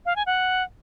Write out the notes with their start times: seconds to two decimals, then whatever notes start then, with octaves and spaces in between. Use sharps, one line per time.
0.06 F5
0.16 G#5
0.26 F#5